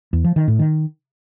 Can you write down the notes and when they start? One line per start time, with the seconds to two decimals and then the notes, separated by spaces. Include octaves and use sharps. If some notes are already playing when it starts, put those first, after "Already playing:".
0.13 E2
0.24 F3
0.36 D#3
0.48 A2
0.59 D#3